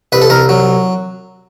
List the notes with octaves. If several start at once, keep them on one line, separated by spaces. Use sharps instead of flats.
C2 B4
A4
C2 A#4
F#3